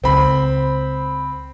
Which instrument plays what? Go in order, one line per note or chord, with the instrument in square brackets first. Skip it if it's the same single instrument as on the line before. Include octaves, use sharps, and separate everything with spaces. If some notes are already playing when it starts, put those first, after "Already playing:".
[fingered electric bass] C#2 [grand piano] C4 B5